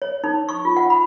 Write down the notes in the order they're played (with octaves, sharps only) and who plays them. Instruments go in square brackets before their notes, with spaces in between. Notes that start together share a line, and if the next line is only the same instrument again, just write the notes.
[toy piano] C#5
D#4
C#6
F4
F#5
B5